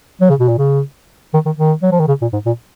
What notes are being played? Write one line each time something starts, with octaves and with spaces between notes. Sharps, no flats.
F#3
C#3
B2
A#2
C#3
D#3
D#3
D#3
F#3
F3
D#3
C#3
A#2
G#2
A#2